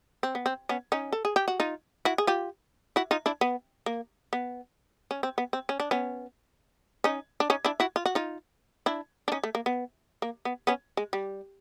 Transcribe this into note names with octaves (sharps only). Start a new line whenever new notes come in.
C4
B3
C4
B3 C#4
C#4 D#4
A4
G#4
G4
F#4
D#4 F4
E4 F#4
G#4
F4 G4
E4 F#4
D#4 F4
D4 E4
B3
A#3
B3
C#4
C4
B3
C4
C#4
D4
B3 C#4
C#4 D#4
D4
C#4 D#4
D4 E4
E4 F#4
F4
F#4
D#4 F4
D4 E4
D4
C#4 D#4
A3
A#3
B3
A#3
B3
B3 C#4
G#3
G3